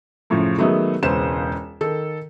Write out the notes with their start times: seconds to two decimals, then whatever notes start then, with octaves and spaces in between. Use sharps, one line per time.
0.30 F#2 A2 C#3 F3
0.58 D#3 F#3 G#3 A3 B3 D#4
1.03 E1 C#2 C#4 B4 C5 E7
1.81 D#3 A4